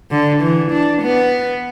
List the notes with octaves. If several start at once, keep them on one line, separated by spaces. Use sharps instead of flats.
D3
E3
D4
B3